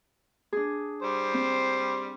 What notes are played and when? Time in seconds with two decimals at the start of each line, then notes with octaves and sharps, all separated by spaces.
0.53 D4 G#4
1.02 G3 C5
1.34 C4